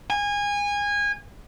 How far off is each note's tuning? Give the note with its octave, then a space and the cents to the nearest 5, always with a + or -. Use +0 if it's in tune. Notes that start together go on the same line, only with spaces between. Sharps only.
G#5 -25